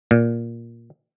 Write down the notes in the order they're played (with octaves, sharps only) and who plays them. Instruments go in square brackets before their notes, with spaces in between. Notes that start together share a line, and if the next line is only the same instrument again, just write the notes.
[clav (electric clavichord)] A#2